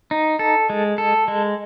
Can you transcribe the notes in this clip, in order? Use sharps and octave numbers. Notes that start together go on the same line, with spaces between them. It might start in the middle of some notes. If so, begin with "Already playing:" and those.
D#4
A4
G#3
A4
G#3